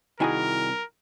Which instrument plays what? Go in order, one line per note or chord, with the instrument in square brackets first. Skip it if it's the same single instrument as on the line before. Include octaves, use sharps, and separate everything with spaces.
[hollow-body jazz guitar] C2 E4 G#5 [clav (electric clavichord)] D#3 F#4 G#4 [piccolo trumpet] A#4